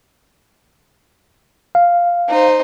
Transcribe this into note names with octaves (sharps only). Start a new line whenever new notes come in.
F5
D#4 C5